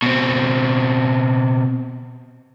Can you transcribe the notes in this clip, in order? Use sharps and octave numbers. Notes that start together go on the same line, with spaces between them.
B2 C4